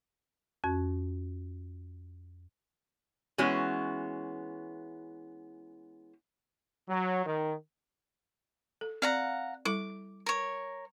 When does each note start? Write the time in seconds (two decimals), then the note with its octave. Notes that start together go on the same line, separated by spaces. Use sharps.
0.64 F2 C#4 F#4
3.38 E3 G#3 B3 C#4 F#4
6.89 F#3
7.26 D#3
8.81 A4
9.02 C4 D5 F5 F#5 A#5
9.65 G3 E4 A4 D6
10.26 A#4 C#5